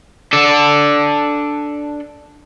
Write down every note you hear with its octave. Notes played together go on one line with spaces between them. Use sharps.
D4 A4